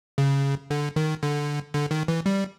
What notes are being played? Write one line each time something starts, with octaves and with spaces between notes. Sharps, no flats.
C#3
D3
D#3
D3
D3
D#3
E3
G3